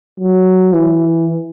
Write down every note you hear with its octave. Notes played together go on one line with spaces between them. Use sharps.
F#3
E3